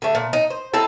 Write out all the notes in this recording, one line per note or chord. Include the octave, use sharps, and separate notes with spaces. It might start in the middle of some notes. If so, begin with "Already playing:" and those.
D3 A3
A#2
D#4
C5
C4 D#4 E4 A4